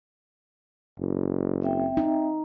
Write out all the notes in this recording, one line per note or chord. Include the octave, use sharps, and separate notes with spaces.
F#1
C4 E5 G5
D#4